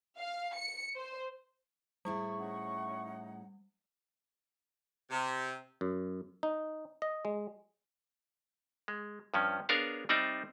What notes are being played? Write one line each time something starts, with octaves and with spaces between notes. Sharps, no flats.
F5
C#7
C5
A2 G3 E4 G#4 C#6
C#4 D#4 F#5
C3
F#2
D#4
D#5
G#3
G#3
G2 F3 C#4
B3 D4 G#4 A#4 C#5 F5
G3 C4 D#4 D5 E5